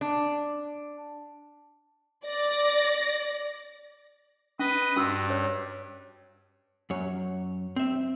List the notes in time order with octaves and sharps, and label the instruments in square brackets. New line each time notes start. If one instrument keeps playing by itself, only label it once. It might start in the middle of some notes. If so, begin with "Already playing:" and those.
[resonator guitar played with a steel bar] D4
[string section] D5 A#6
[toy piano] C#4 [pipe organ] B4 D#5
[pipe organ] G2 [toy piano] C#4 F#4 E6
[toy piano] C#5
[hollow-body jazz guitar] F#2 C#5
C4 E5